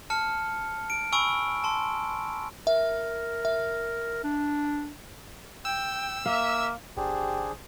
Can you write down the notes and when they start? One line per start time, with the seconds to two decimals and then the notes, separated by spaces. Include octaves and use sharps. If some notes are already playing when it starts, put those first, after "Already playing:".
0.10 A5 F6 C#7
0.90 D7
1.12 G#5 B5 C#6 E6 D7
1.64 A5 C6
2.67 A#4 E5
3.45 E5
4.24 D4
5.65 G5 E6
6.26 A#3 E5 F5
6.97 G1 D4 G4 G#4 C5